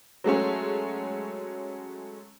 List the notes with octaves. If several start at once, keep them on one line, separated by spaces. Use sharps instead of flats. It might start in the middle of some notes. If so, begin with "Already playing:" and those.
F#3 G#3 A3 C#4